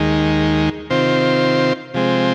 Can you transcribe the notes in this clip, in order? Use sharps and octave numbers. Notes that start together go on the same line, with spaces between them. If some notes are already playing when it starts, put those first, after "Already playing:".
Already playing: D#2 D#3 G#3
C3 D#3 C4 F4 C5
C3 F3 G#3 C4